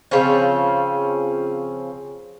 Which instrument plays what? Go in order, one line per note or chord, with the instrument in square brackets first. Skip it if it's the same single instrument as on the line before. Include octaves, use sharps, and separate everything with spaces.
[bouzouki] C#3 F3 C4 C#4